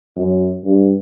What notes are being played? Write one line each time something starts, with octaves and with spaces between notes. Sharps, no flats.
F#2
G2